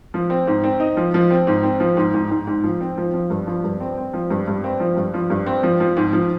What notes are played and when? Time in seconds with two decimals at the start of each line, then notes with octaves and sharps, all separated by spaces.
0.14 F3
0.30 C4
0.47 G#2
0.64 C4
0.80 D#4
0.97 F3
1.14 F3
1.30 C4
1.47 G#2
1.63 C4
1.80 F3
1.97 G#2
2.14 G#2
2.30 G#2
2.47 G#2
2.64 F3
2.80 C4
2.98 F3
3.14 F3
3.30 G2
3.47 F3
3.64 G2
3.80 C4
3.98 C4
4.13 F3
4.30 G2
4.48 G2
4.64 C4
4.80 F3
4.97 G2
5.14 F3
5.30 G2
5.46 C4
5.63 F3
5.80 F3
5.97 G#2
6.13 F3